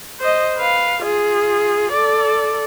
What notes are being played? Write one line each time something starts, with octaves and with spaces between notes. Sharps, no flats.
C5 D#5
B4 F5
F4 G#4
A4 D5